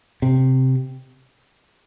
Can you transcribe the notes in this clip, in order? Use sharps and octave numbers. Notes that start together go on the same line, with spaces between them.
C3